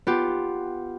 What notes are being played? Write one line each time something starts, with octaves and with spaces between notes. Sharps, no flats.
B3 F4 G4